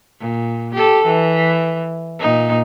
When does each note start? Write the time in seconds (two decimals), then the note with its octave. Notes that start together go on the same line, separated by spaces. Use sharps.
0.20 A#2
0.74 G4 A4
1.06 E3
2.20 A#2 D#4